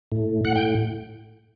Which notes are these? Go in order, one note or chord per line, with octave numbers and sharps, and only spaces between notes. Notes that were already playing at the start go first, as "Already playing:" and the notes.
A2
A2 F#5
G5